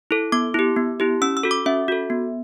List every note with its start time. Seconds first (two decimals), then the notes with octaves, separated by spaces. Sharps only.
0.11 E4 A4
0.32 B3 D6
0.54 E4 G4
0.76 B3
1.00 E4 G4
1.22 C#4 E6
1.37 E6
1.43 F#4 A4
1.51 D6
1.66 C#4 E5
1.88 F#4 A4
2.10 B3